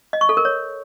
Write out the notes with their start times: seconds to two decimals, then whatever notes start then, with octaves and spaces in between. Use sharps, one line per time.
0.13 D#5
0.21 C#6
0.29 A4
0.37 A#4
0.45 C#5